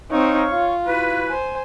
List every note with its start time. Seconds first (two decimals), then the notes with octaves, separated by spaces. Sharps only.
0.11 C4 D#4 C#5 F5 C#6
0.52 F4
0.85 E4 F#4 B4
1.28 C5 G#5